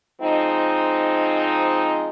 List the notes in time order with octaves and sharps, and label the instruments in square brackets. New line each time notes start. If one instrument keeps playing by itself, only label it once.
[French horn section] F3 G#3 C4 D#4